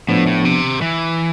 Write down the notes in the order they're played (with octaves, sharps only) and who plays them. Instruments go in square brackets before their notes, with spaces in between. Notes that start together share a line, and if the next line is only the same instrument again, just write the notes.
[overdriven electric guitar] A2 [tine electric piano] F3 B3 D4
[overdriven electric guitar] A2
C3
E3